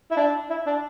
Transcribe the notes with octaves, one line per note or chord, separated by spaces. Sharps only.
E4
D4
E4
D4